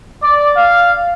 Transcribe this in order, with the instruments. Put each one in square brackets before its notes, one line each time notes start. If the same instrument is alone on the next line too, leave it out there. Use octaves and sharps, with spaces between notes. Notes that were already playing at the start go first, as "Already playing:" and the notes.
[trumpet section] D5
F5